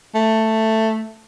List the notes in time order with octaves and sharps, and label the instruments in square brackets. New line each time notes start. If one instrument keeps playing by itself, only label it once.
[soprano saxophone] A3